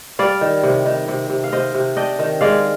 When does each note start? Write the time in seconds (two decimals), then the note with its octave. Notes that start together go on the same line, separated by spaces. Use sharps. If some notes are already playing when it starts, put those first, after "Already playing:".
0.19 G3 D5 F5
0.41 D#3
0.63 C3
0.86 D#3
1.08 C3
1.30 C3
1.44 F5
1.52 C3 C5 D#5
1.75 C3
1.96 D4 D#5 G5
2.19 D#3
2.41 G#3 D5 F5